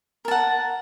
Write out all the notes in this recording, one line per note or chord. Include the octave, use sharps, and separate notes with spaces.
A#4 F#5 A5